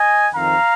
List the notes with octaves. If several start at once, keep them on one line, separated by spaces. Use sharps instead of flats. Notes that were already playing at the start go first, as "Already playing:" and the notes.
Already playing: D#5 G#5
F2 D#3 C4 F5 A#5